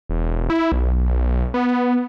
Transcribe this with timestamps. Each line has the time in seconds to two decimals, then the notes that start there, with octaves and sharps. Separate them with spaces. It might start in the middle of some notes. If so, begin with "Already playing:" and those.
0.09 E1
0.50 E4
0.72 B1
1.54 B3